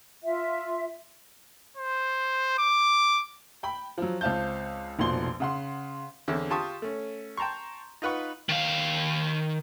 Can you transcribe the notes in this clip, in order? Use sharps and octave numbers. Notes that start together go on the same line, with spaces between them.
F4 E5
C5
D6
G5 B5
F3 F#3
C#2 C4 F5 A5 G6
F1 A#1 B2 F3 C6 G7
C#3 F#5 C6
E2 D3 C4 C#5 E5
F4 G4 A5 C6 C#6 D#6
A3 C#4
G5 A5 A#5 C6 C#6
D#4 F4 B4 F#5 C#6
D#3 F5